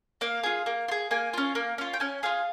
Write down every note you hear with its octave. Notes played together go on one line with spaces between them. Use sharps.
A#3 F5
F4 G#4
A#3
F4
G#4
A#3 G#5
C#4 F4
A#3
C#4 F4
G5
C#4 G#5
F4 G#4 F5